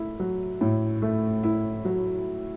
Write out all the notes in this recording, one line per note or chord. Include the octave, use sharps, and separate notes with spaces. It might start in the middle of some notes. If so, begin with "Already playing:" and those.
Already playing: A3 E4
F#3
A2
A3
E4
F#3